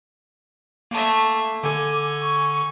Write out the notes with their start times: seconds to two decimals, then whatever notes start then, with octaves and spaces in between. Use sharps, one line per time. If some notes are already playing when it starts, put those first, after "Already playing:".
0.91 A3 A#3 E5
1.63 D3 A4 G#5 D6
2.22 C#6